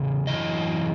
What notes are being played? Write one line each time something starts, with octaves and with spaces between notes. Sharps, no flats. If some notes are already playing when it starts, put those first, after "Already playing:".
Already playing: E2 C#3
F#2 C#3 E3 D#5